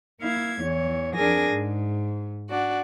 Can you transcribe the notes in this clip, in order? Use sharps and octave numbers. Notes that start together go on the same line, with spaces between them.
A#3 E4 F5 G#6
E2 E3 C#5
F2 D4 G#4 A#4 G#5 A#6
G#2
D4 F#4 D5